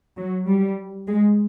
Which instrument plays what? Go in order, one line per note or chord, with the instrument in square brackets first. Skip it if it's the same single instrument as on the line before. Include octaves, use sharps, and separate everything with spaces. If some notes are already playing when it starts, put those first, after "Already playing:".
[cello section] F#3
G3
G#3